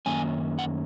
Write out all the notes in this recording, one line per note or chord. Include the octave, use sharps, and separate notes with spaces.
F#2 D#3 A#3 C#4 G#5
F#5